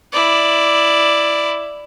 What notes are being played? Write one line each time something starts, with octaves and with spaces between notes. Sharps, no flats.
E4 D5